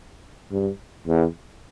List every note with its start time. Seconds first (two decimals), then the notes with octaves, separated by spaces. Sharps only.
0.52 G2
1.07 E2